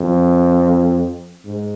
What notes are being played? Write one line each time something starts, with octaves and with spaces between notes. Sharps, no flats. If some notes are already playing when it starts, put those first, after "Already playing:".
Already playing: F2
G#2